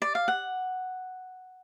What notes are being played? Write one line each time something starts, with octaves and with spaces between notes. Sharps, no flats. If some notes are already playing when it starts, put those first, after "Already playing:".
D5
F5
F#5